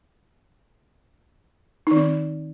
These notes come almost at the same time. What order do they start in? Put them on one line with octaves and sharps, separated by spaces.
D#4 D#3 C4